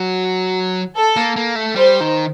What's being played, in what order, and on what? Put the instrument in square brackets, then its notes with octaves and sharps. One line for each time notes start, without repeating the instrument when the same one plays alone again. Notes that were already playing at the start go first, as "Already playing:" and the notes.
Already playing: [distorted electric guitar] F#3
[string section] A4
[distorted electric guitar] A#3
A#3
A3
[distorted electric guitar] G3 [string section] C5
[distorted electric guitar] D#3